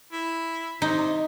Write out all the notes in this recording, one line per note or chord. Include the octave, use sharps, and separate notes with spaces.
E4
C3 D#4